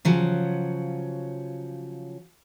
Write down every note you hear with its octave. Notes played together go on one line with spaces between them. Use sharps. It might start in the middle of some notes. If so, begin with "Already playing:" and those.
C#3 F3 F#3